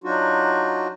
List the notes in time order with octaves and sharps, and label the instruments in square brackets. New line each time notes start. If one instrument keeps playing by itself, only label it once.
[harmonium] F#3 D4 D#4 F4 F#4